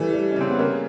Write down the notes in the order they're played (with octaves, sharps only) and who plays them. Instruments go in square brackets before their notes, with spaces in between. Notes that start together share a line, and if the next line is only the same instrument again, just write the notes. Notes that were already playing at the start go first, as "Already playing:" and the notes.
Already playing: [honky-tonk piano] E3 G3 [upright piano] A3
[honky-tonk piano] G3
[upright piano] C#4
[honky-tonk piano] C#3 [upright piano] C4
[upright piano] B3
[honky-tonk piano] C#3 [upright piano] A#3